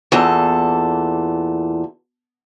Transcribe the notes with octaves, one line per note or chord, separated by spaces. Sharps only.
E2 A#2 A4